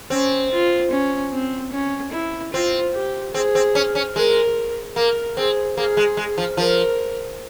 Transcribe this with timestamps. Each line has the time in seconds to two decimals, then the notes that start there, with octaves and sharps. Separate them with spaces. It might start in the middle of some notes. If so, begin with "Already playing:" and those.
0.10 C4 C#4
0.52 F4
0.91 C#4
1.32 C4
1.72 C#4
2.13 E4
2.53 C4 F4
2.94 G4
3.34 C4 G#4
3.55 C4
3.75 C#4
3.95 C#4
4.15 G#3 A#4
4.96 A#3 A#4
5.37 C4 G#4
5.77 A#3 G#4
5.97 G#3
6.17 G#3
6.38 F3
6.57 F3 A#4